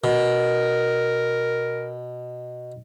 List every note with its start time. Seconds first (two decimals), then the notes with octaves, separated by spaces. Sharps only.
0.04 B2 A#4